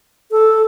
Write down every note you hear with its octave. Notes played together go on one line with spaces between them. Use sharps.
A4